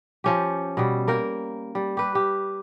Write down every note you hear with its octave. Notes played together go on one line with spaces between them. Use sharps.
F3 C#4 G4
B2 G3
A#3 A#4 G5
G3
G4 B4
G4